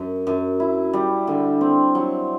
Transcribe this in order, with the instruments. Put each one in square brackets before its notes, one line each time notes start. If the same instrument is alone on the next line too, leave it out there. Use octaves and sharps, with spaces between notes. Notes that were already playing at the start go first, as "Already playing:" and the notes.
Already playing: [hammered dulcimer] F#2
F#2
E4
G3
D3
C4
F#3